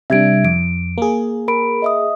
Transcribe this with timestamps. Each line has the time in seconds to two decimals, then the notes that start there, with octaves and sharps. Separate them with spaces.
0.10 C3 G3 D4 E5 G#6 D7
0.45 F2 D7
0.98 A#3 G#4
1.48 A#4 B5 D7
1.82 D#5 E5 D#6